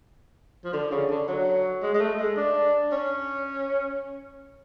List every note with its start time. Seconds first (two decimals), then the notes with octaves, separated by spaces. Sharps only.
0.65 F3
0.73 D3
0.91 C#3
1.10 D3
1.28 F#3
1.83 G#3
1.94 G#3
2.01 A3
2.19 G#3
2.37 D4
2.92 C#4